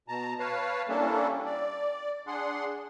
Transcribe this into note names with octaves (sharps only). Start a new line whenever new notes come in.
B2 A5 A#5
B4 C#5 F5 A5
G3 A#3 C#4 D4 E4 A4
D5
D4 G#4 F#5 C6